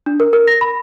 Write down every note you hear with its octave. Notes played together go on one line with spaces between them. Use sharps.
D4
A#4
A#4
A#6
B5